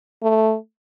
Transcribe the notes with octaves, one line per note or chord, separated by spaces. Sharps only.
A3